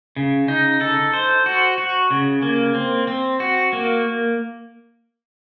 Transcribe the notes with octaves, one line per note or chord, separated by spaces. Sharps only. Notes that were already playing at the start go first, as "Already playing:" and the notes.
C#3
D#4
A4
C5
F#4
F#4
C#3
A#3
C4
C4
F#4
A#3